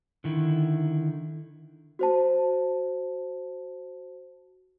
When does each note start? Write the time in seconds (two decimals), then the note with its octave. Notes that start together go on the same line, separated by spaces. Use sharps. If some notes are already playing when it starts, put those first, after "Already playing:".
0.24 D3 D#3 E4
1.99 F#4 C5 A5